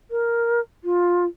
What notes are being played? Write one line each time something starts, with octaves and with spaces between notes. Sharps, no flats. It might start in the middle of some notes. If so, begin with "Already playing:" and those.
A#4
F4